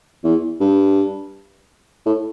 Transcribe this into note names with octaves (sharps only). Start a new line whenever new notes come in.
E2
G2
A2